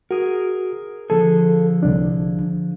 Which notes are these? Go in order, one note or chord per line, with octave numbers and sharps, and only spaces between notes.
F#4 G#4 A#4
D3 F3 G#4 A4
C2 D4